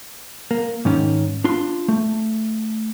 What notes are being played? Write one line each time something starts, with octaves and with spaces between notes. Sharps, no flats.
A#3
G#2 D#3 C#4
D4 F4 C6
A3